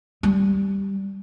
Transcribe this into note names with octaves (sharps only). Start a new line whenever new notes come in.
G3